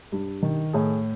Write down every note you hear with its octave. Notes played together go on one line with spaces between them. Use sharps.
G2
D#3
A2 G#4